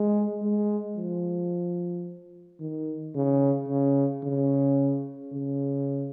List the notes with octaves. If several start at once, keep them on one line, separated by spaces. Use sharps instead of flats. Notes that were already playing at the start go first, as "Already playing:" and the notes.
Already playing: G#3
G#3
F3
D#3
C#3
C#3
C#3
C#3